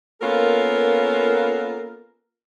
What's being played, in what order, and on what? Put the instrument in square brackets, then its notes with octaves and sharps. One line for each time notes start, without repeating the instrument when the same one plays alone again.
[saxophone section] A#3 B3 C#4 F4 A4 A#4